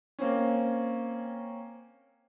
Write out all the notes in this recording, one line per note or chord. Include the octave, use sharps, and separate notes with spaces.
A#3 C4 C#4